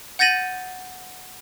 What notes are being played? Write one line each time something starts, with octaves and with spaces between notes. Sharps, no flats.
F#5 G6 A6 A#6 D#7 F#7